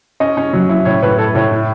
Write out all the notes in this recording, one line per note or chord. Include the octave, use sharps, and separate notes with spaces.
C#4 D#5
C#4
F#3
E4
A2 C#5
A2 B4
A2 A4
A2 C#5
E4